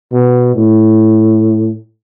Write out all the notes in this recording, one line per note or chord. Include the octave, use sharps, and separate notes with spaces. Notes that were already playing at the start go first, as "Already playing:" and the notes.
B2
A2